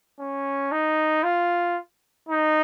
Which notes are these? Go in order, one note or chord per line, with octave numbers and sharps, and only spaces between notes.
C#4
D#4
F4
D#4